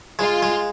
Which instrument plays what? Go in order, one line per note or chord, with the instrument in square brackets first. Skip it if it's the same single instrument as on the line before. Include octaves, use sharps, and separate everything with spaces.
[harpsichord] G#3 [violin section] F4
[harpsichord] G#3